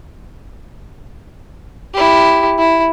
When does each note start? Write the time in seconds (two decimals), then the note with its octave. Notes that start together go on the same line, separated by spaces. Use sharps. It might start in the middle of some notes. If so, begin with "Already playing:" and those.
1.94 E4 G4
2.58 E4